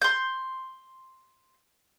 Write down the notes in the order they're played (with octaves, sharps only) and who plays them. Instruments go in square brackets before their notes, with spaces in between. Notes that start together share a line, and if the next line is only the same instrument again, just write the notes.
[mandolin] C6 G6